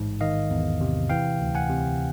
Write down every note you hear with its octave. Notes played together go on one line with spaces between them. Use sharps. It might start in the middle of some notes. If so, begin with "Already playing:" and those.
Already playing: A1 G#2
D#3 D#5 F5
E2
C3
E3 F5 G5
D2
F#5 G#5
C3